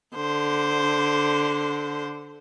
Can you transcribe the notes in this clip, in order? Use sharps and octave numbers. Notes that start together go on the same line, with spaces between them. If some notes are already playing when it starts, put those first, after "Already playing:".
D3 C5